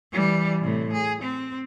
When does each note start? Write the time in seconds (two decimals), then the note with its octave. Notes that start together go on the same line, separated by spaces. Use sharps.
0.12 E3 G3
0.61 A2 C3
0.92 G#4
1.22 C4